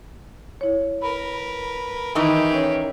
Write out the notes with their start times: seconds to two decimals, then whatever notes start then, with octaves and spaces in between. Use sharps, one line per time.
0.61 E4 C#5
1.02 A#4 B4 B5
2.15 D#3 E3 D#4 G4 G#4
2.52 C#4 C#5